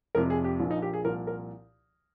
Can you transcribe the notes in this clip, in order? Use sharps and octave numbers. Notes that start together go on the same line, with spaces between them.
F1 F2 C3 F3 A#4
G#4
G4
A#1 A#2 F3
D#4
G4
G#4
C2 A#2 F3 A#4
A#4